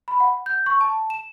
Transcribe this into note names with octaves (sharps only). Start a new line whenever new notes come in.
B5
F#5
G6
C#6
A5
E7